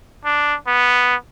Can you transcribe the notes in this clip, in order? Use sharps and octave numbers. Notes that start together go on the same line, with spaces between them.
D4
B3